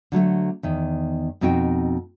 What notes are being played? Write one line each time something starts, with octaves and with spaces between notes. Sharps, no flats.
D3 F#3 G#3 A3
E2 D#3
F2 B2 C4 D#4 F#4 G5